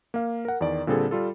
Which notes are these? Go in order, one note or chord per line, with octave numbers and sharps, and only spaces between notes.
A#3 F5
A#4 F#5
E2 D#3 D5
A#2 D3 G3 C4 G#4 A4
G3 F4 A4